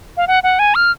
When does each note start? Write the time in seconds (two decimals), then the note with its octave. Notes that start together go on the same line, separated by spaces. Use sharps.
0.17 F5
0.28 F#5
0.43 F#5
0.59 G#5
0.75 F6